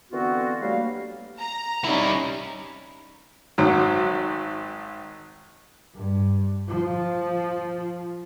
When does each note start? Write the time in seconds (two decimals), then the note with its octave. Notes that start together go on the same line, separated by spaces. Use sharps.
0.11 D3 E3 B3 C4 F4 F#4
0.61 F#3 G3 A3 A#3 F5
1.38 A#5
1.84 G3 C#4 D#4 E4
3.58 G#1 F#3
5.95 G2
6.68 F3